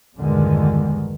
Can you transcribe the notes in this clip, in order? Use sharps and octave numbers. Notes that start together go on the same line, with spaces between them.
A#1 E2 G2 D3 D#3 G#3